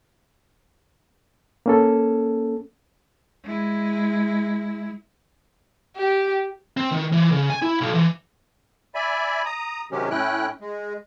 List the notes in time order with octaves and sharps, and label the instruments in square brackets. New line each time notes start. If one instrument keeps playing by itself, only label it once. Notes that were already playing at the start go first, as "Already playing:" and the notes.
[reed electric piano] A#3 C#4 A4
[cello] G#3 E4
[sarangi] G4
[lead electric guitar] C4
D#3
E3
C#3
G#5
E4
B1
E3
[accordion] D5 E5 G#5 B5
A#5 D#6
C3 D#3 F#3 G#3 C#4 G4
A2 C#4 E4 G5 F#6
G#3